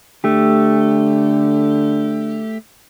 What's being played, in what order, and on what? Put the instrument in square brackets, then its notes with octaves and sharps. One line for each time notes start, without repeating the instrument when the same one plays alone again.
[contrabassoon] D3 [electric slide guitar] A3 G4